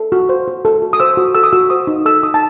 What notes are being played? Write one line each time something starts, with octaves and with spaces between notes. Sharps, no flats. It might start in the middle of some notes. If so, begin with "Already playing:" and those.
Already playing: A4
F#4
C5
F#4
A4
F#4
D#6
C5 E6
F#4
A4 E6
D#6
F#4 E6
C5 D#6
D#4
A4 E6
D#4 D#6
A5